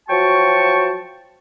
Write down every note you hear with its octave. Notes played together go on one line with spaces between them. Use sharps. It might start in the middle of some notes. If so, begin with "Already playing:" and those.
F3 F#3 F#4 G5 A5 C#6